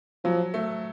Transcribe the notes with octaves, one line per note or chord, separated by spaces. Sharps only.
F3 F#3
A3